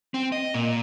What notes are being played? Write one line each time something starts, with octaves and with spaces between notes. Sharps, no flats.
C4
D#5
A#2